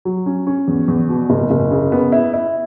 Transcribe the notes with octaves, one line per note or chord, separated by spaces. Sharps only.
F#3
C#4
C#4
E2
E2
B2
F#1
F#1
C#3
B3
E4
E4